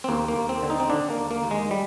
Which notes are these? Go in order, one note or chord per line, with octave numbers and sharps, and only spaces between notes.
C4
D#2 A#3
A#3
D#2
C4
D3
D#4
C4
D3 D4
A#3
D#2
A#3
D#2
G#3
G3